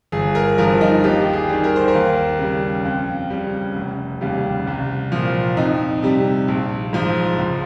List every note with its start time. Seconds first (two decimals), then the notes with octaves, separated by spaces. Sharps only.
0.12 G1 G#4
0.35 A#4
0.58 G2 F3 A#4
0.81 D#4
1.04 D#2 G4
1.33 G#4
1.49 D#3 G3
1.64 A#4
1.76 C5
1.88 A#4
1.95 D#2
2.39 C#3 G3
2.85 F2
3.30 C#3 G3
3.76 F1
4.21 D#2 C#3 G3
4.67 C2
5.12 A#2 F3
5.57 F2 D#4
6.02 C3 G3
6.48 A#1
6.93 G#2 F3
7.38 C#2